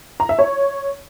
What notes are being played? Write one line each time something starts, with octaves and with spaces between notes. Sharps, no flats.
A#5
E5
C#5